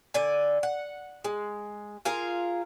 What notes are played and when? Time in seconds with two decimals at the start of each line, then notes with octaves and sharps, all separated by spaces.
0.14 D3 D5 G#5
0.63 F#5
1.25 G#3
2.05 F4 G#4 A#4 F5